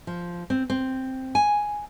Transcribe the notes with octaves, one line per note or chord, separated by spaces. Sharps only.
F3
C4
C4
G#5